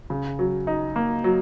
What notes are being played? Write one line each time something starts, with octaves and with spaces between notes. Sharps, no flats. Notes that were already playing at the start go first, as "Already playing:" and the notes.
C#3
F#3
D#4
A#3
F#3